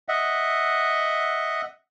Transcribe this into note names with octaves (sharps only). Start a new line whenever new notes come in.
D#5 E5 F#5